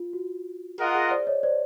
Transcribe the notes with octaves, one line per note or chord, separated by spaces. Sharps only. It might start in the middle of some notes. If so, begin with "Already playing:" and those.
Already playing: F4
F#4
F4 G#4 A#4 D#5 F#5
G#4
C5 D5
C#5 D#5
C5 D5